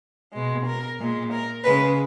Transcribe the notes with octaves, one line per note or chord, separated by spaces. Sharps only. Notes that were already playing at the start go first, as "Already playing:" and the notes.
B2 G#3
A#4
A#2 G#3
A#4
C#3 G#3 B4